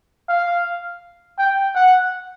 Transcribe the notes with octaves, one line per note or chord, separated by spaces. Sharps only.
F5
G5
F#5